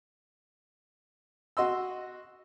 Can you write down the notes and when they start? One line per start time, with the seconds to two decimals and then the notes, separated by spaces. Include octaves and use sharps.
1.57 F#4 D#5 C6 E6